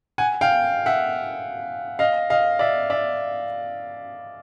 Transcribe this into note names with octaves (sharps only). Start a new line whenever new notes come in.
F#5 G#5
F5 G5
E5 F#5
D#5 F5
D#5 F5
D5 E5
D5 E5